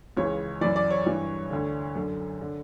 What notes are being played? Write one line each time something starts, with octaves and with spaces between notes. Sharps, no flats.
C#2 C#3 E3 C#5
F#2 E3 D5
D5
C#5
G2 E3
D2 D3
F#2 D3
D3